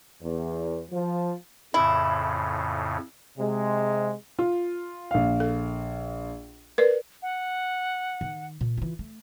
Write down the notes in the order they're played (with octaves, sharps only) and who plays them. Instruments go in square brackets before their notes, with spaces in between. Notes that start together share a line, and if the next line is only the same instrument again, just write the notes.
[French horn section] E2
F3
[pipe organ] F2 A2 C#3 [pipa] E4
[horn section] C3 G#3
[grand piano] F4
A#1 F5
[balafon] A4
A#4 B4 D5
[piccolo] F#5
[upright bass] D#3
A#2
E3 F4
A3